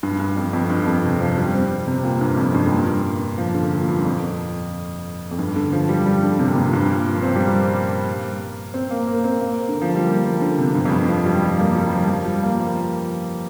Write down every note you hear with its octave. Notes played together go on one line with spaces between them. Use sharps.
G2
G2
F2
F2
G2
F2
C3
F3
G3
C4
C3
A#2
G2
F2
G2
A#2
G2
F3
D3
A#2
G2
F2
F2
G2
D3
F3
G3
G3
D3
C3
A#2
G2
G2
A#2
F3
C4
G3
A#3
C4
A#3
A#3
C4
A#3
D3
F3
G3
A#3
F3
D3
C3
G2
F2
G2
F3
G3
G3
A#3
G3
G3
F3
F3
G3
A#3
F3